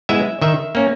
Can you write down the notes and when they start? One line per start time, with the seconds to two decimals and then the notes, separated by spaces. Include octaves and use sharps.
0.09 G#3 B3 E4 E5
0.42 D#3 E5
0.75 A#3 C#4